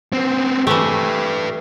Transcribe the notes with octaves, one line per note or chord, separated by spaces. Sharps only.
B3 C4
E3 A3 G4 B4